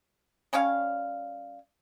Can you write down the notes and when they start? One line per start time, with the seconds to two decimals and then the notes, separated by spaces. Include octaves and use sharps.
0.53 G3 C#4 C#5 F5